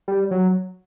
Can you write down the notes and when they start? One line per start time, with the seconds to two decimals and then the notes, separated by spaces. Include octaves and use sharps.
0.08 G3
0.31 F#3